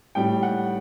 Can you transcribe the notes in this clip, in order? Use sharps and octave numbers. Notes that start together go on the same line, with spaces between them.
A2 G3 G5
F#5